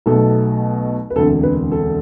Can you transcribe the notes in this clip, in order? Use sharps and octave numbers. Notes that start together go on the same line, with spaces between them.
B1 B2 A3 A4
B4
E1 D2 C3 A4
B4
A4